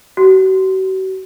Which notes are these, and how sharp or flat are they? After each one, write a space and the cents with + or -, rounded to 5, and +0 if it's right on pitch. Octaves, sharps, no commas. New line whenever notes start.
F#4 +40